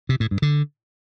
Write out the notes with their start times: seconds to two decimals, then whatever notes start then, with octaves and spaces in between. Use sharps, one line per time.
0.09 C3
0.20 A2
0.31 G2
0.42 D3